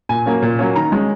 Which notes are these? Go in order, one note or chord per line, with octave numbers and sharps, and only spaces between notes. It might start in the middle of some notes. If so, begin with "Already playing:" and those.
A#2 G#5
F#3 A#3 C#4
A#2
F#3 A#3 C#4
D#3 A#5
G#3 C#4